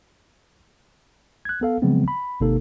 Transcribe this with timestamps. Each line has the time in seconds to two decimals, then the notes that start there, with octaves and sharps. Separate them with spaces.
1.45 F#6 G#6
1.61 B3 A4 F5
1.82 C#3 F3 F#3 G#3 B3 C4
2.08 B5
2.40 G#1 C3 A#3 D#4 A4